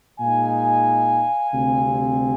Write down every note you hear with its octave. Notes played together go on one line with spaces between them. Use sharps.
A#2 G#3 D#4 F5 G#5
D2 C3 G3 C4